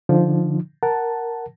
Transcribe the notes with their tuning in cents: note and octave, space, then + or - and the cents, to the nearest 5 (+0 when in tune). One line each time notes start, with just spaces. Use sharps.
D3 +0 F3 +0 D#4 -25
A#4 +0 F#5 +10 A5 +0